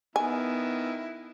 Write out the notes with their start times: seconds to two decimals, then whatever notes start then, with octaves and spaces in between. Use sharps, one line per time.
0.16 D#3 B3 E4 G#5